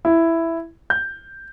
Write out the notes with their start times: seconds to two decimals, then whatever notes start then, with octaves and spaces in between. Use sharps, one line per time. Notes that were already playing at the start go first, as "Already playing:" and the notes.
0.05 E4
0.90 G6